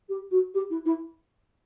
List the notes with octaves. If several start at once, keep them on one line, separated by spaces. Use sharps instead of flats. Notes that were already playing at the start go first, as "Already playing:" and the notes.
G4
F#4
G4
E4
E4